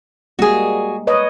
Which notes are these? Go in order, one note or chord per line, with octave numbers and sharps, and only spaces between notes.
G3 G#3 A#3 F#4 G#4
B4 C#5 D#5